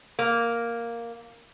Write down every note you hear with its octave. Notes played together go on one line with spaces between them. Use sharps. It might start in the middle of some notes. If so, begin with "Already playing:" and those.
A#3